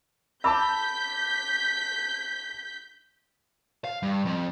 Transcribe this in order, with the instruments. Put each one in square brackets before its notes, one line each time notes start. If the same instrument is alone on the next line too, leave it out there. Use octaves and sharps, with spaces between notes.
[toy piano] E5 B5 [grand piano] A5 D6 E6 [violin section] G6 B6
[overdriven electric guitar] F5
G2
F2